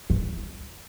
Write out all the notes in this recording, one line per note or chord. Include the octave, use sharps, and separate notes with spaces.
E3